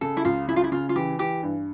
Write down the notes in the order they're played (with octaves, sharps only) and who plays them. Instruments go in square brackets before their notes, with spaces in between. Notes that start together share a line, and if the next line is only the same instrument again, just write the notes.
[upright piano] C#3 [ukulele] A4
[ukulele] E4
[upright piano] C#2 [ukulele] F4
[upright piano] C#3 [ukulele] E4
[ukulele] F4
E4
[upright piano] C#3 [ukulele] F4
[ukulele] F4
[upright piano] E3 [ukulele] G4
[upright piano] E3 [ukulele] G4
[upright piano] G2